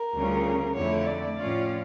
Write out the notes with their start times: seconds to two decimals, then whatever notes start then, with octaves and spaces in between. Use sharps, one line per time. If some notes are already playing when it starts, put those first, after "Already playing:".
Already playing: A#4
0.16 D2 C#3 G3 C#4 F4
0.76 F2 D3 A3 E4 C#5
1.06 D5
1.37 A2 F3 C#4 F4